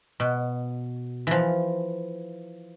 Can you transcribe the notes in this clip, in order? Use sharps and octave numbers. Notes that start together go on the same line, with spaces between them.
B2
E3 F3